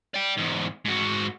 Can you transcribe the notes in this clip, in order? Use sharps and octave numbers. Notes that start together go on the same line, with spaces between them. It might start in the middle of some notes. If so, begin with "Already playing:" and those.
D5 G5
E2 G#2
G#2 F#4